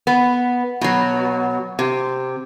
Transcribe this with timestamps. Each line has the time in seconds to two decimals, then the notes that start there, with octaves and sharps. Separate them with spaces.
0.07 B3
0.81 B2 F#3
1.79 C3